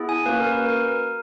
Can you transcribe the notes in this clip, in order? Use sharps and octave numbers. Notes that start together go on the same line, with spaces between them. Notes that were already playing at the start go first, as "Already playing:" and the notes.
Already playing: B3 E4 G#4
G#5
A#3 C#4 F#4 B4
A#4
B4
A#4